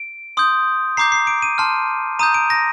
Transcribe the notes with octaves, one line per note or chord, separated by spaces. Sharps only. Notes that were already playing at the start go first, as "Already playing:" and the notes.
Already playing: D7
C6 D#6 G6
A#5 D6 G6 C7
C7
D7
D#7
A5 C6 F6
A#5 D#6 G6 D#7
D7
A#6